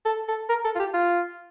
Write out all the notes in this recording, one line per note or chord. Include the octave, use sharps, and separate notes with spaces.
A4
A4
A#4
A4
F4
G4
F4